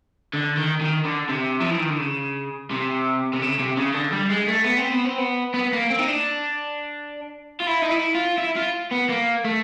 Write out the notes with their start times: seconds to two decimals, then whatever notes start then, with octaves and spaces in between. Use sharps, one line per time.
0.33 D3
0.57 D#3
0.81 D#3
1.05 D3
1.29 C3
1.60 F3
1.70 E3
1.79 D#3
1.90 D3
1.99 C#3
2.71 C3
3.33 C3
3.42 C#3
3.59 C3
3.77 C#3
3.94 D3
4.12 G3
4.30 G#3
4.48 A3
4.65 B3
4.78 C4
4.92 B3
5.05 C4
5.18 B3
5.54 B3
5.72 A#3
5.90 C4
5.99 D#4
6.08 D4
7.60 F4
7.67 E4
7.82 D#4
7.91 E4
8.15 F4
8.38 E4
8.56 F4
8.91 B3
9.09 A#3
9.45 A3